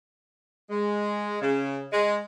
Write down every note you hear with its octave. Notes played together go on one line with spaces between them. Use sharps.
G#3
C#3
G#3